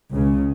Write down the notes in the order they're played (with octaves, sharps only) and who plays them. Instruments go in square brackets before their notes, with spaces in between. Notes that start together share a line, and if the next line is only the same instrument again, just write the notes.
[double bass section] C#2 C#3